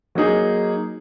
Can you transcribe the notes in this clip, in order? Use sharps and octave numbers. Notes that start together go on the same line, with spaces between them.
F#3 A#3 D#4 G#4